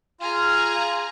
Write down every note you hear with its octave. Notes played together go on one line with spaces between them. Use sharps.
F4 G#4 F5 A#5